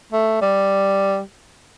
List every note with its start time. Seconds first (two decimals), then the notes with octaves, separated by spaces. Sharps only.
0.12 A3
0.42 G3